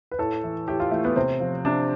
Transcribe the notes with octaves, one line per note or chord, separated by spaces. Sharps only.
B4
A2 A4
E3
A2 G4
F4
E3 A3
B3
C3 C4
F3
C3 D4